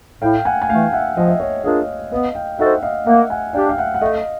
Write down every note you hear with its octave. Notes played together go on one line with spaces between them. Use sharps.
A2 F5 G5
F#5 G#5
G#5
E3 A3 F5 G5
E5 F#5
F3 D#5
E5
C#5 D#5
A#3 D4 F4 G#4 D#5 F5
B3 D#5 F5
F5 G5
D#4 F#4 A4 C5 E5 F#5
D#5 F5
A#3 E5 F#5
F#5 G#5
D4 G4 F5 G5
F5
E5 F#5
F#5
A3 D#5 F5